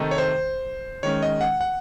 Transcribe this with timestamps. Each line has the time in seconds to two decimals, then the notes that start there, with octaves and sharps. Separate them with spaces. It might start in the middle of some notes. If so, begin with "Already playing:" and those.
Already playing: C3 D#3 A3 D#4
0.11 C#5
0.18 C5
1.03 D#3 G#3 C#4 C#5
1.23 D#5
1.41 F#5
1.61 F#5